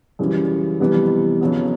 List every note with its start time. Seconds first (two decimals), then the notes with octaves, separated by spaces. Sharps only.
0.19 F#2 C#3 E3 G3
0.80 F2 C3 E3 G3 B3
1.41 F2 C#3 F#3 B3